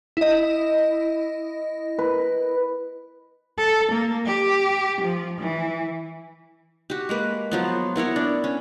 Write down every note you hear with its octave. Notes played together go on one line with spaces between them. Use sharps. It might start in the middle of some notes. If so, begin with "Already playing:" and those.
E4 D#5
B4
A4
A#3
G4
F3
E3
F#4 G4
G#3 A#3 B4
F3 F#3 B3
B3 E4 A#4 C#5
D4
C#4